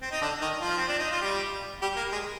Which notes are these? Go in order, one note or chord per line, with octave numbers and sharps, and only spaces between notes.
C4
D#4
D3 D4
D#3 D#4
F3 F4
C4
D4
D#4
F4
G3 G4
G3 G4
A#3
G#3